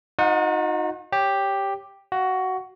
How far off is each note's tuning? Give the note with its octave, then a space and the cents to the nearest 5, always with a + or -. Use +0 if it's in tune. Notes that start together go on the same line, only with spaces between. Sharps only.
D#4 +0 F#4 -45 F#5 +0
G4 +5 C#5 +0
F#4 +15 F5 +0